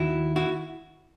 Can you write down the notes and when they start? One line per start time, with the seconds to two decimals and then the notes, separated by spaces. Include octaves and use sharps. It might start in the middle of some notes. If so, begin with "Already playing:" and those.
Already playing: D#2 D#3 E4 F#4
0.36 E4 F#4